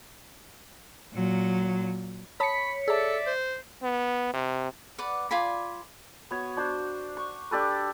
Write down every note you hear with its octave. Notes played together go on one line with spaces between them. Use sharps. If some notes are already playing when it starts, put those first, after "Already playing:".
A#2 F#3
C#5 A5 B5 D#6 B6 C#7
G#4 A4 D5 E5 A5
C5
B3
C3
B4 D5 F#5
F4 D5 G#5 B5
B3 F#4 C#5
D4 F#4 C5
C#6
D4 G4 A4 B4